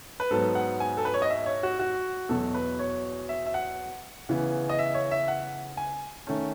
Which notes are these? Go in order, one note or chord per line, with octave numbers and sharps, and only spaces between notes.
B4
G#2 F#3 B3 A4
F#5
G#5
A4
B4
C#5
D#5
E5
C#5
F#4
F#4
E2 B2 F#3 A4
B4
C#5
E5
E5
F#5
C#3 E3 B3
D#5
E5
C#5
E5
F#5
G#5
D#3 A3 C#4